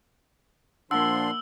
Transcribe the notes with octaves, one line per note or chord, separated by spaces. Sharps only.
A#2 F3 A#3 D4 F#5 C6 E6 G7